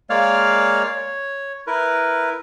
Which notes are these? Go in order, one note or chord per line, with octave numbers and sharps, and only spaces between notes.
G#3 A#3 C#5 D5 F5 F6
C#5
E4 A#4 B4